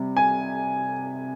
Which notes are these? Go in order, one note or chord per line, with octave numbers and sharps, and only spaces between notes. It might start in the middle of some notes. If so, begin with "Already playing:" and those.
Already playing: C3 G3
G#5